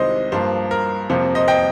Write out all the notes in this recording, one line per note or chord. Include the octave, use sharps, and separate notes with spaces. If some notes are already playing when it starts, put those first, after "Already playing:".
Already playing: C2 C3 D#3 G#3 C5 D#5
G2 F3 A#3 C5
A#4
F2 C3 F3 A#3 C5
C5 D#5
D#5 G5